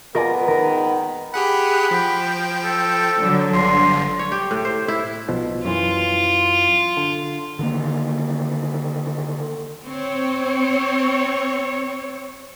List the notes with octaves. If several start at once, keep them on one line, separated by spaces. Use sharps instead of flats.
A#2 G#3 B3 F4 A#4 D5 G#5
D#3 A#4
G4 G#4 F#5 B5
F3 G5
A4
D3 F#3
G1 G2 D3 C6
C#5
G4
A2
C5
E4
B1 B2 F3
F#2 E3 F4
D3
D3 D#3 A#3
C4 C#5